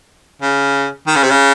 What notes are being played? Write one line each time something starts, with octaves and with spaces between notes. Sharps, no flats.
C#3
D#3
C#3
C3
C#3